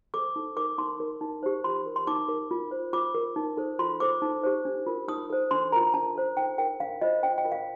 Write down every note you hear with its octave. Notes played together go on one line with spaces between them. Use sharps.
A4 C5 D6
D#4
A#4 D6
D#4 C6
A#4
D#4
G4 C5
F4 C6
A#4
C6
D#4 D6
A#4
F4
C5
F4 D6
A#4
D#4
A4 C5
F4 C6
A4 C5 D6
D#4
G4 C5
D4
F4 A#4
D#4 D#6
A4 C5
D4 C6
F4 A#4 A#5
D4 A5
A4 C5
D#4 G5
A#4 G5
D4 F5
F4 C5 D#5
D4 G5
G5
F4 A#4
F5